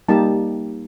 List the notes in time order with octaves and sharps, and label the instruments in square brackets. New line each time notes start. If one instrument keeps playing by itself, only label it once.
[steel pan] G3 A#3 D#4 G4 A5